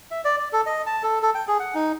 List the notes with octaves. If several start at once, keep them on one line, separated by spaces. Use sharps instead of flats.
E5
D5
D5
A4
D#5
A5
A4
A4
G5
G#4
F#5
D#4